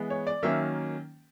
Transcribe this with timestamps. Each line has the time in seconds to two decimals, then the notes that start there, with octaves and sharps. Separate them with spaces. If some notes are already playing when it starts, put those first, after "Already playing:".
Already playing: E3 G#3 B3
0.10 C#5
0.27 D5
0.43 D#3 F#3 A#3 C#4 E5